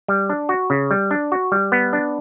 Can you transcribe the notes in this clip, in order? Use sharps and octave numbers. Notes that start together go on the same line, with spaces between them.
G3
D4
F#4
C#3
G3
D4
F#4
G3
B3
D4